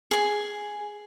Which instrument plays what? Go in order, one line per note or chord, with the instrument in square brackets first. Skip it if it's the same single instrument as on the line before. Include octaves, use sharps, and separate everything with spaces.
[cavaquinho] G#4 G#5